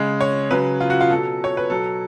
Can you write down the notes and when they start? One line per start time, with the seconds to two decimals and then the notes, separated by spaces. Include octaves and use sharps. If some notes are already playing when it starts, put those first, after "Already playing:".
Already playing: C#3 G#3
0.21 C#5
0.51 C#3 F#3 B4
0.80 F4
0.90 F#4
1.01 F4
1.10 B2 F#3 A4
1.44 C#5
1.57 B4
1.69 B2 F#3 A4